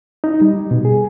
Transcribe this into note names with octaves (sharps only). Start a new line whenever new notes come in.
D#4
G3
B2
G#4